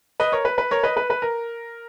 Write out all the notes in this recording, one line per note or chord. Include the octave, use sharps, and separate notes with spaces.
B4 D#5
A#4 C#5
B4
B4
A#4 C#5
B4 D#5
B4
B4
A#4